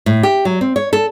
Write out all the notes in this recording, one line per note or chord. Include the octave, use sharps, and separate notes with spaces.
A2
G4
F#3
C4
C#5
A4